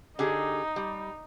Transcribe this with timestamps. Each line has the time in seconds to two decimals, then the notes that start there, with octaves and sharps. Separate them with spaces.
0.19 D3 D#4 G4 G#4
0.76 G3